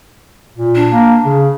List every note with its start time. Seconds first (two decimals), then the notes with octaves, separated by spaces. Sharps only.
0.56 A#2
0.75 D4
0.91 A#3
1.26 C#3